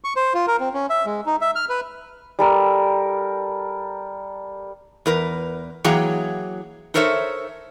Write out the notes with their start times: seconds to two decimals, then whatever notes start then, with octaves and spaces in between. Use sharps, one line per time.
0.04 C#6
0.16 C5
0.34 F4
0.47 A#4
0.60 C4
0.74 C#4
0.90 E5
1.06 G#3
1.26 D#4
1.41 E5
1.56 F6
1.69 B4
2.39 G3 A4 A#4
5.06 E2 A#4 B4
5.84 E3 F#3 A#3 G#4 G5 A#5
6.94 D#4 A4 A#4 C5 C#5 E5